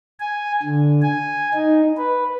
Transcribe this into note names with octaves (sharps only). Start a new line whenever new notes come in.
G#5
D3
G#5
D#4
B4